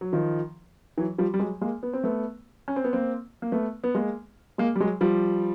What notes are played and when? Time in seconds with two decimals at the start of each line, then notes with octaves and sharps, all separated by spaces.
0.01 F#3
0.13 D#3 F3
0.98 E3 F#3
1.18 F3 G3
1.34 G3
1.39 F#3 G#3
1.61 G#3 A#3
1.83 B3
1.93 C4
2.04 A3 B3
2.68 C#4
2.76 C4
2.84 B3
2.93 A#3 C4
3.42 A#3
3.52 A3 B3
3.84 B3
3.95 G#3 A#3
4.58 G#3 A#3
4.76 G3
4.81 F#3 G#3
5.01 F3 G3